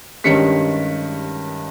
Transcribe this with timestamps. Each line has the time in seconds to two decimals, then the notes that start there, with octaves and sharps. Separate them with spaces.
0.24 G2 D#3 G#3 C#4 B6 C#7